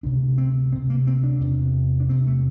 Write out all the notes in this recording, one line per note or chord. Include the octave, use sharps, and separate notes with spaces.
D2 C3 D4
C4
D2 C3 C4
A#3
C4
D4
E2 C3
D4
E2 C3 C4
A3